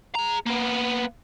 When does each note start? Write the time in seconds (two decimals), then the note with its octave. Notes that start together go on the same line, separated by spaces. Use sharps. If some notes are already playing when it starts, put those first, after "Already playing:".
0.15 G#4 A#5
0.46 A#3 B3